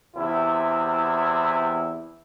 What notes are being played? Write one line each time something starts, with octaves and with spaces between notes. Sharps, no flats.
E2 C3 E4